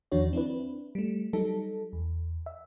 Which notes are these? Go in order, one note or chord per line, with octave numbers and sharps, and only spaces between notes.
E2 D#3 F3 D4 F#4 C#5
C4 D4 E4 B4
G3 A3
F#3 G3 D#4 A4
E2
E5